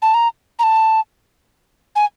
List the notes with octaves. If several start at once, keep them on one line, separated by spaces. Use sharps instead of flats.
A5
A#5
A#5
A5
G#5